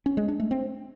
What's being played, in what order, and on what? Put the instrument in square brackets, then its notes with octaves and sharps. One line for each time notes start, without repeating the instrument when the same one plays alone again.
[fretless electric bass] C#4
G#3
D4
A3
C4